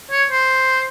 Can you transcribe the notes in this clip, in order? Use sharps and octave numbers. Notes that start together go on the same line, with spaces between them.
C#5
C5